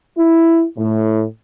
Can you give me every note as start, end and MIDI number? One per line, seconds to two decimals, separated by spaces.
0.18 0.64 64
0.77 1.25 45